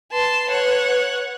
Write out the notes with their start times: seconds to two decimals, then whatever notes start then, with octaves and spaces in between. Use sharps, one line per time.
0.12 B4 A5 C6
0.50 C#5 F#5